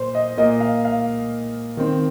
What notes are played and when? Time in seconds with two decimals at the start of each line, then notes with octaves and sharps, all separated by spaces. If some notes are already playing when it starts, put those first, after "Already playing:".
Already playing: A#2 C5
0.15 D#5
0.38 A#2 A#3 D#5
0.60 F5
0.85 F5
1.77 D#3 C4